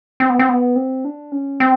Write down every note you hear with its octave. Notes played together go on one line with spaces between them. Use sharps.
C4
B3
C4
B3
C4
D4
C#4
C4